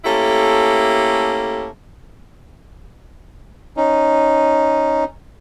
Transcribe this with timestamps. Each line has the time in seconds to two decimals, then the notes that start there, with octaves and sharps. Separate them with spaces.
0.04 A3 A#3 C#4 E4 G4 A4
3.77 C#4 D#4